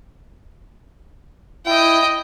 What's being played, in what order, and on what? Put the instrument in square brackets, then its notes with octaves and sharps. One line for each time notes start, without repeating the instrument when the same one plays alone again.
[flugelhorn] E4 [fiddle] D#5 G5